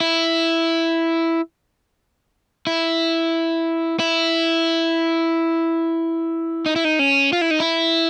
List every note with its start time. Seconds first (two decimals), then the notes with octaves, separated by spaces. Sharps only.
0.01 E4
2.67 E4
4.00 E4
6.66 D#4
6.76 E4
6.85 D#4
6.99 C#4
7.33 F4
7.41 E4
7.51 D#4
7.60 E4